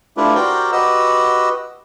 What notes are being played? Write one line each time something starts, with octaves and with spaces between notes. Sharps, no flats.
A3 D4 E4 F4 G4 B4
F#4 G4 A#4 C5 D5 G5
F#4 G4 B4 D#5 F#5 E6